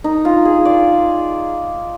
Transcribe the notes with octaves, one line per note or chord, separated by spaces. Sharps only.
D#4
F4
G#4
D5